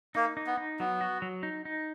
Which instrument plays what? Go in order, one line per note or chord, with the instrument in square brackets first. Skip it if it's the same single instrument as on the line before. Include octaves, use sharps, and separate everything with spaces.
[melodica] A#3 [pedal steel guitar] D#4
[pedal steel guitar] D#4
[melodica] B3
[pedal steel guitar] D#4
[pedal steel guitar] F#3 [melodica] B3
[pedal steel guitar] F#4
F#3
D#4
D#4